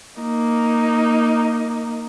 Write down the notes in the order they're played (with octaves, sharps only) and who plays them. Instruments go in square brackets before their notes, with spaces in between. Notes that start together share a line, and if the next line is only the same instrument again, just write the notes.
[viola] A#3 D#4